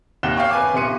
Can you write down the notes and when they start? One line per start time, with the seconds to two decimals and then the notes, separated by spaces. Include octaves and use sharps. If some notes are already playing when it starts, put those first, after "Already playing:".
0.23 D#2 C3 F#5 F#6 E7 G7
0.37 C#5 F5 G5 C#6
0.51 B4 G#5 D6
0.73 D#1 C3 B3 C6 C#7 D#7